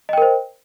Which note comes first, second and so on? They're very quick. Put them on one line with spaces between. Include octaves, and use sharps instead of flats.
D#5 G5 A#4 C5